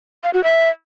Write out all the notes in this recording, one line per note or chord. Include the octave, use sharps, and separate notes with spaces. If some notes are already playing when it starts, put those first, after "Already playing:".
F5
F#4
E5